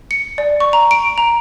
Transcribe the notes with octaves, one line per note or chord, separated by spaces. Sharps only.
C#7
D5
C#6
A#5
D7
A#5